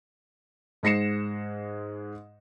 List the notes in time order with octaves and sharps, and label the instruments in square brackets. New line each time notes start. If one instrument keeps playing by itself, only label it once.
[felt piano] G#2 G#3 A#6 C7 C#7 E7